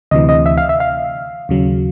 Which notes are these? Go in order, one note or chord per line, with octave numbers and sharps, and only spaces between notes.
D2 C3 E3 D#5
D#5
E5
F5
E5
F5
D#2 C#3 F#3